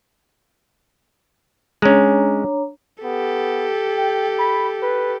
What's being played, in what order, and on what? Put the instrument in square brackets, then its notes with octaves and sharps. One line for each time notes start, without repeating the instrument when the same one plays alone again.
[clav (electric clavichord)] G#3 C#4 [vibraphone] D4 C#5 A#5
[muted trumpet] B3 [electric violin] G4 A4
[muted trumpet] G5
B5
B4